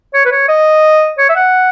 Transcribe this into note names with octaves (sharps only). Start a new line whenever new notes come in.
C#5
B4
C#5
D#5
C#5
E5
F#5